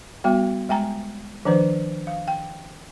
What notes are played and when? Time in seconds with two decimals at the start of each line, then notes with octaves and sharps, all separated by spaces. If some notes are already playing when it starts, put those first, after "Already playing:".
0.24 G3 B3 F#4 G5
0.69 G#3 G5 G#5 A#5
1.45 D#3 F3 D4 B4 C5
2.07 F5
2.28 G5